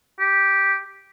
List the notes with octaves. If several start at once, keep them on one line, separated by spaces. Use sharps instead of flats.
G4